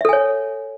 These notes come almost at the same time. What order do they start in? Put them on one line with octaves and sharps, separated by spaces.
E5 A4 G#5 C#5